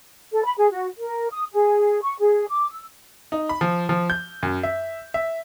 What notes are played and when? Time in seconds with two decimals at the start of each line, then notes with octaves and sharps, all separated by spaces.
0.32 A4
0.44 B5
0.58 G#4
0.72 F#4
0.97 A#4
1.31 D#6
1.53 G#4
2.02 C#6
2.19 G#4
2.49 D6
2.70 E6
3.32 D#4
3.49 B5
3.61 F3
3.89 F3
4.10 G6
4.43 F#2
4.63 E5
5.14 E5